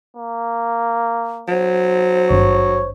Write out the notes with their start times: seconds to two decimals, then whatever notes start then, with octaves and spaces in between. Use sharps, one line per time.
0.17 A#3
1.48 F#3 C5
2.30 G#1 G2 C#5